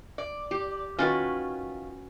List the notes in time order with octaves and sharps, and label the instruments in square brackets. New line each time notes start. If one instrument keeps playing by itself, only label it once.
[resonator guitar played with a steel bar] D5
[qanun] G4
[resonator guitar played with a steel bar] D#3 F4 [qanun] C#4 F#4 B4